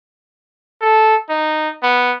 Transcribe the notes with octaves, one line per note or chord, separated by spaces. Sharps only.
A4
D#4
B3